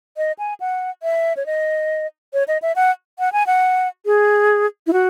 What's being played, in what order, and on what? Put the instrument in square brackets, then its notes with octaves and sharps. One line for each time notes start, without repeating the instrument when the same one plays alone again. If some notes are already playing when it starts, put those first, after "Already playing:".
[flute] D#5
G#5
F#5
E5
C#5
D#5
C#5
D#5
E5
F#5
F#5
G#5
F#5
G#4
E4
F#4